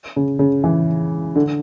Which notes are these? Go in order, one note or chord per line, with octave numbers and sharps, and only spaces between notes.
C#3
C#3
E3
D3